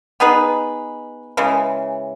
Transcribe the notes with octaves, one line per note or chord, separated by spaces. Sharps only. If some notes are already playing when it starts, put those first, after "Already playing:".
B3 D#4 G#4 B4
C#3 E3 G#3